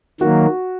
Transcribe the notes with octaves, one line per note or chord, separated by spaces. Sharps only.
D#3 F#3 A#3 F#4